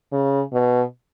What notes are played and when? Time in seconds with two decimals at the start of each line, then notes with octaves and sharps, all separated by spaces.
0.12 C#3
0.53 B2